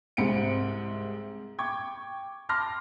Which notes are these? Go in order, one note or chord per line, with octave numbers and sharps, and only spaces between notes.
C2 G#2 C3 C4 C#7 D7
G5 C#6 D6 G#6
A5 C6 D6 F6 A#6